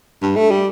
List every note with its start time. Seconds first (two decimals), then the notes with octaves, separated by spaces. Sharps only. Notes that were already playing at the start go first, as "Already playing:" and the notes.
0.22 G2
0.36 A3
0.51 G3